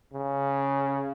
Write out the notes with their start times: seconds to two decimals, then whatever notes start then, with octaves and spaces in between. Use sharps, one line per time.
0.14 C#3